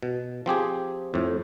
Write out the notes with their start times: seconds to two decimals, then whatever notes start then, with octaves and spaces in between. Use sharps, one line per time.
0.03 B2
0.46 F3 C4 G4 G#4
1.14 F2 A2